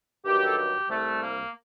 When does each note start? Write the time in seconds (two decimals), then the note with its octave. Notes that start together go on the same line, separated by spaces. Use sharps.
0.25 G2 D#3 F#3 G4
0.45 A4
0.56 G4
0.88 C2 C3 G3 A3
1.20 A#3